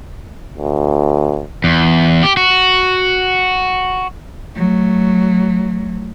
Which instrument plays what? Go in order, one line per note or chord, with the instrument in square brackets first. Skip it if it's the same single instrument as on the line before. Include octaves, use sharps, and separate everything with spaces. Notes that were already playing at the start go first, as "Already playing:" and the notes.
[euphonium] D2
[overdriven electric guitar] E2
G4
F#4
[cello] F#3 A3